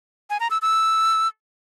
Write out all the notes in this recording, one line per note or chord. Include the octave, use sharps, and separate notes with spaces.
G#5
A#5
E6
E6